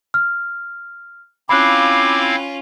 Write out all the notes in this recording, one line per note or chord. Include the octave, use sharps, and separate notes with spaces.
F6
C4 C#4 E4 F4 F5 B5 D6 F#6